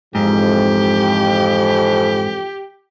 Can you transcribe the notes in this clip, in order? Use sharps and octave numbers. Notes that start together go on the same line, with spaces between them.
F2 G#2 E3 G4